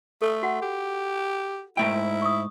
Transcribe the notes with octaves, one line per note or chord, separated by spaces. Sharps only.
A3 A4
F#4 F#5
G4
G#2 A3 E4 G5
C#6 D#6